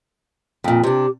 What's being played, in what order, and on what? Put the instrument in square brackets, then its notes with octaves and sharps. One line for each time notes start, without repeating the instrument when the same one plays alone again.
[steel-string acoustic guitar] F2 A#2
[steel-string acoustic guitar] C3 D4 [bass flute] G4